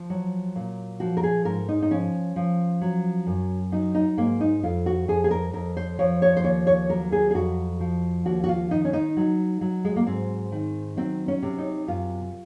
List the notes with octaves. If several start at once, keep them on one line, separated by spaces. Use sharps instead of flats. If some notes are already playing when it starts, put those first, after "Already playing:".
Already playing: F3
F#3
A#2
F3 F#4
A#4
G#4
G#2 A#4
D#4
D#4
F3 C#4
F3
F#3
F#2
F#3 D#4
D#4
G#2 A#3
D#4
F2 F4
F#4
F2 G#4
G#4
A#4
F2 A#4
C5
F3 C#5
C#5
C5
D#2 C#5
C#5
F#3 A#4
G#4
G#4
F2 F#4
F3
D#2 F#4
F#4
F4
D#3 D#4
C#4
D#4
F#3
F#3
G#3
A#3
G#2 C4
D#3
F#3 C4
C#4
C3
D#4
F#2 F4